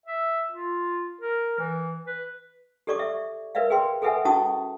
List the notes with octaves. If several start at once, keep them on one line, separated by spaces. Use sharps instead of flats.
E5
F4
A#4
E3
B4
G4 A4 D5 C#6 D6
E5
A#4 B4 D5 E5 F5
G#4 B4 G5 C6
G#4 A4 B4 E5 F#5 G#5
C#4 E4 F#4 A5 C#6 D#6